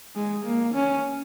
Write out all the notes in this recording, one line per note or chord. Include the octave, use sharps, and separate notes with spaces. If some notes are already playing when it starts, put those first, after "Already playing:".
G#3
A#3
C#4